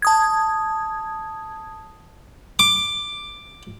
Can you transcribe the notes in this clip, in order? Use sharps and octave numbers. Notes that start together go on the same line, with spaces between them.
A5 D#6 G#6
D6